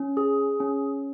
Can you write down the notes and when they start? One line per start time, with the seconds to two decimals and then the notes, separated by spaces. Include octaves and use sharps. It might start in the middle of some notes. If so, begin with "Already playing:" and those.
Already playing: C#4
0.17 G#4
0.60 C#4